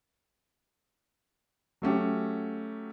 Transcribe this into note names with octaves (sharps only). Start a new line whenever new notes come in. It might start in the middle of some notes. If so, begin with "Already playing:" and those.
F#3 A3 C#4 G4